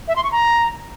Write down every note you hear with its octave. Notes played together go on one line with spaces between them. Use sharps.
E5
C6
C#6
A#5